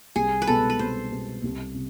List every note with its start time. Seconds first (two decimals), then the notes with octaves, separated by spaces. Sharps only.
0.16 C2 G#4
0.42 B4
0.47 B2 G#3 B3 A4
0.70 B4
0.79 C2 C5
1.11 B2 G#3 B3
1.43 C2
1.75 C3